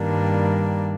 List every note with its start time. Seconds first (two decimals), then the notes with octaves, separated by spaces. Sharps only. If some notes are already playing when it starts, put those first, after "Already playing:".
Already playing: G2 D#3 G3 A#3 D4